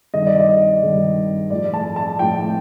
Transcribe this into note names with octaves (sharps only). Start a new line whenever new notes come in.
G2 D#3 G3 D#5
D5
D#5
G2 D#3 G3
A2 F3 D5
A5
A5
A2 F3 G5